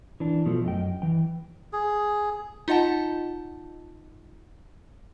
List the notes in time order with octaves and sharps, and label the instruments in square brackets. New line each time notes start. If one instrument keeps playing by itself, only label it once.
[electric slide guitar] E3 D4
B2 F3 A3
F#2 D#5 G5
E3 G5
[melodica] G#4
[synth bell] D#4 F4 D#5 F#5 A5